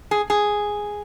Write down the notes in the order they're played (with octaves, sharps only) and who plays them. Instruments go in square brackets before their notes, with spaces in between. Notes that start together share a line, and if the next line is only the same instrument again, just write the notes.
[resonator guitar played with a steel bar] G#4
G#4